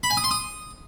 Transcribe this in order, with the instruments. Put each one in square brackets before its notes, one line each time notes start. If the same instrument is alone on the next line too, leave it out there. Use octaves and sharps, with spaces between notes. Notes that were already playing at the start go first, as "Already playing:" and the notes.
[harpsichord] B5
G#5
D#6
C6
D#6